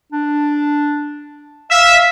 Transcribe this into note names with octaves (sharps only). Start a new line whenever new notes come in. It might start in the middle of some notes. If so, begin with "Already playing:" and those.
D4
E5 F5